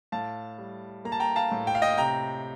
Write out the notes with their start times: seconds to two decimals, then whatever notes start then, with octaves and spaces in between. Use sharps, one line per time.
0.12 A2 F5 A5
0.58 G3
1.05 A#3 A#5
1.12 A5
1.20 G5 A#5
1.36 F5 A5
1.51 A2
1.67 G5
1.75 F5
1.82 D#5 G5
1.97 C3 G5 A#5